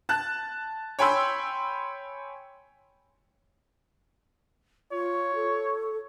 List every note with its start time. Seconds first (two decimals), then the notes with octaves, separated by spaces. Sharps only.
0.09 A5 F#6
0.99 C#5 G5 G#5 B5 C6 E6
4.92 F4 C#5
5.35 A4